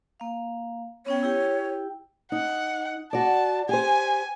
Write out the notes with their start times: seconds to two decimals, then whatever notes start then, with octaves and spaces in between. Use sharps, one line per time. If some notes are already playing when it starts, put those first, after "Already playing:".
0.20 A#3 F5
1.06 B3 C#4 C#5 G5
1.23 E4 G4 G5
2.32 D#4 F#5
3.13 F#4 D5 A5
3.69 G4 C5 G#5